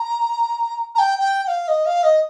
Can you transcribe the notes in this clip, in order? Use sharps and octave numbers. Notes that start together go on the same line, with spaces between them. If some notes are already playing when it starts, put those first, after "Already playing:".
Already playing: A#5
A#5
G5
G5
G5
F5
D#5
F5
D#5